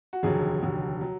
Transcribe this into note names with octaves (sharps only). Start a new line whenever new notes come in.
F#4
F1 D#2 D3 F#3 G#4
F1 D#2 D3 F#3
F#3